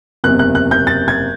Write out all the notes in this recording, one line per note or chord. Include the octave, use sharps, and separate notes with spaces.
F#1 E2 C3 F#6
F#6
F#6
G6
A6
G#6